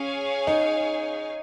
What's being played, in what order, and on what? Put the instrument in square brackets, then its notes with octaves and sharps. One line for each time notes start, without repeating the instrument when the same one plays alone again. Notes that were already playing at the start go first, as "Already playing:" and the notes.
Already playing: [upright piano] C#4 [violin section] G#4 C#5 F5 G#5
[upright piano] D#4